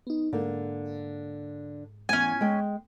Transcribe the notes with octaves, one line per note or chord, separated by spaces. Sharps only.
B3 D#4
G#2 D3 A#3
E2 G2 C#4 G#5
G#3 G5